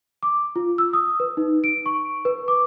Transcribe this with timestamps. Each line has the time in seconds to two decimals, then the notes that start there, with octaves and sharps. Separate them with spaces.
0.23 D6
0.56 F4
0.78 E6
0.93 D#6
1.20 B4
1.37 D#4
1.64 D7
1.86 C#6
2.25 B4
2.48 D6